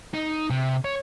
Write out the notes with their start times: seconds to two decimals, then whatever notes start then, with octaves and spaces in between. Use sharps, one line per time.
0.14 D#4
0.50 C3
0.85 C#5